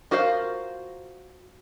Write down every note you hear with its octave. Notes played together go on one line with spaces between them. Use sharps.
F4 F#4 A#4 C5 F5